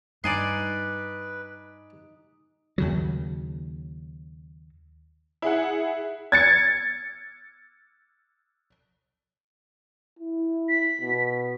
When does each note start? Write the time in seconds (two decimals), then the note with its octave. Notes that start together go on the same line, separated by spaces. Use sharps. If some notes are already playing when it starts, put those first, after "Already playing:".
0.24 G2 D#4 B4 D5 G#5 C6
2.78 D#2 C#3 F#3
5.42 E4 G#4 F#5
6.32 G#6 A6 C#7
10.19 E4
10.69 B6
11.01 B2